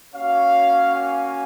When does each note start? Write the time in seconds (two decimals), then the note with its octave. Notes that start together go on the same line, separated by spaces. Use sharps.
0.14 A#3 C#4 F#4 C#5 F5
0.95 F5 G#5